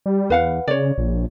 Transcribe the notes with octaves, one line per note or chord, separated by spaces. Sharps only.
G3
E2 B4 F5 F#5
C#3 C#5 D5
A#1